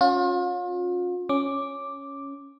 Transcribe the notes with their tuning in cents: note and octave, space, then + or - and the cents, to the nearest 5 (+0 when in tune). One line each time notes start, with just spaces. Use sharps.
C#4 +0 F4 +40
C#4 +0 D6 +0